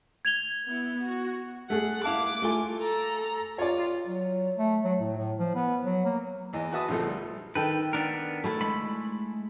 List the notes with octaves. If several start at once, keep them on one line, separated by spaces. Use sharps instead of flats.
G#6 F7 G7
B3 E4
F#4
A3 G#4 F#5
E4 F5 A5 D6
A3 F4 G#5
A4 A#5
F4 C#5 D5
F#3
A3
F#3
A2
A2
F3
B3
F#3
A#3
E2 E3 D#5
F#4 B4 E5 A5 D#6
A#1 D3 F3 C4 A4
G3
D#3 A4 B4 G5
B3 D4 A#4
A3 E4 A4
G#3 B5